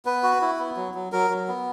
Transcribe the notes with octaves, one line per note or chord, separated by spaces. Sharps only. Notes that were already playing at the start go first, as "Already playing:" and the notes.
B3 B4
F#4
E4
B3
F#3
F#3
F#3 A#4
F#3
B3